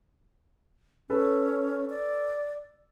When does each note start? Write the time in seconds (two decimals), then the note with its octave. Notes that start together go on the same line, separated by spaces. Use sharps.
1.10 C#4 A4 B4
1.90 D5